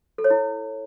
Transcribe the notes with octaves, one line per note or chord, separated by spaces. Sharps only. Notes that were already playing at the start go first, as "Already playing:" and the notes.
A4
C#5
E4